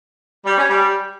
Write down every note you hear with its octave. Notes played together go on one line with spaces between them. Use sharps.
G3
C#4
G3